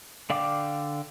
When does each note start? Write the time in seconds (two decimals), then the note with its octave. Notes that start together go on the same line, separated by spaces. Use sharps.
0.30 D3 D5 F5 G5 D6